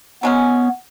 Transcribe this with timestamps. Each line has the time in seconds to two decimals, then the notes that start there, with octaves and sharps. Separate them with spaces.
0.23 F#3 G#3 B3 C#4